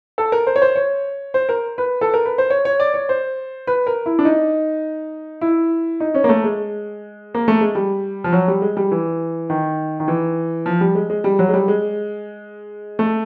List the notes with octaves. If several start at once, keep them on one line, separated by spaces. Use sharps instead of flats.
A4
A#4
C5
C#5
C5
C#5
C5
A#4
B4
A4
A#4
B4
C5
C#5
C#5
D5
C#5
C5
B4
A#4
E4
D4
D#4
E4
D#4
C#4
A#3
A3
G#3
A#3
A3
G#3
G3
F3
F#3
G3
G#3
G3
E3
D#3
D#3
E3
F3
G3
G#3
G#3
G3
F#3
G#3
G3
G#3
A3